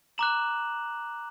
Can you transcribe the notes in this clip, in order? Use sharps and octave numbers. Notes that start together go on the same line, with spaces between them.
A#5 D6 F#6 E7 F#7